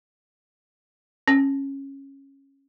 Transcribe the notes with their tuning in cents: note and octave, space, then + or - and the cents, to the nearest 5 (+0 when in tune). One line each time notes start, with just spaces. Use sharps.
C#4 -15